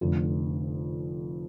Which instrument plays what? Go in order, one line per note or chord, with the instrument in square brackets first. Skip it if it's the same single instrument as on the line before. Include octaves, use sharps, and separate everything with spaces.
[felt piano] F1 F2 D3